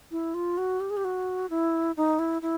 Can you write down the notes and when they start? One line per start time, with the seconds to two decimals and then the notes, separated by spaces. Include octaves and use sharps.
0.11 E4
0.34 F4
0.58 F#4
0.80 G4
0.90 G#4
0.97 G4
1.05 F#4
1.50 E4
1.97 D#4
2.19 E4
2.42 E4